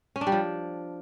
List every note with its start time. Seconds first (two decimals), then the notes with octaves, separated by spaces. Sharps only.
0.16 C#4
0.21 D4
0.27 G3
0.32 F3